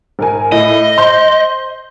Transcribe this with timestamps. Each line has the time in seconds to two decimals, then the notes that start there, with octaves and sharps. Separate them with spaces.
0.19 G#1 A#4 G#5
0.52 A2 D#5
0.97 C5 C6 G6